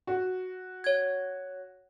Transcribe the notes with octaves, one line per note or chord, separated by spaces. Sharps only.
F#4
C#5 G#6